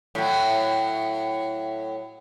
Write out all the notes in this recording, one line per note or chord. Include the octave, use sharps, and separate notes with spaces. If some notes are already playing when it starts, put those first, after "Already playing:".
A2 F#3